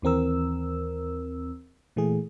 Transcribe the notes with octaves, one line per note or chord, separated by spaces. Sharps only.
D#2 E3 C4 A#4 E6
A#2 E3 A3 G#4